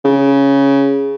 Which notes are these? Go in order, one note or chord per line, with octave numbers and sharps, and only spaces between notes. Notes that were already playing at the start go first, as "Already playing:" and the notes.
C#3